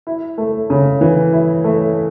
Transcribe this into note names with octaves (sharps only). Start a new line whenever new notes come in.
E4
A3
C#3
E3
E4
A3